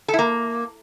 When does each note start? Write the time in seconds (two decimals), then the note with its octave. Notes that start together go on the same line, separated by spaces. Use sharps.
0.08 A4
0.14 E4
0.19 A#3